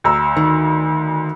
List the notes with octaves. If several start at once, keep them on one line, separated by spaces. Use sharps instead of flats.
D2 A#5 E6
D#3